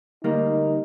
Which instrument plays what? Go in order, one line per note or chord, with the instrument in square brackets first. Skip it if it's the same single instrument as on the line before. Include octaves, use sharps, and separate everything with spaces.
[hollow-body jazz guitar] D2 G3 A#3 [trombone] D#4